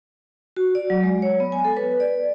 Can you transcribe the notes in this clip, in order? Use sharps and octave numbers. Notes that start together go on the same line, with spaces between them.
F#4
D5
F#3
G#3
C#5
B3
G#5
A4
B4
D5